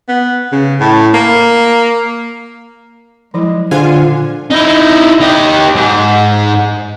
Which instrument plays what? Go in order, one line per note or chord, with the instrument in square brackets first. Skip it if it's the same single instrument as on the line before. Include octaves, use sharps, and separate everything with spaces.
[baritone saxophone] B3
C#3
A2
A#3
[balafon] F3 F#3 E4 [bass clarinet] G#3
[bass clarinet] A#2 [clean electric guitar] D3 [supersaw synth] F4 G#5 [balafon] G#4 C5
[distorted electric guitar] D#4 E4
D#4 G4
G#2